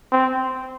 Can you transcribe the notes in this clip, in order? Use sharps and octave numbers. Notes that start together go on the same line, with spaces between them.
C4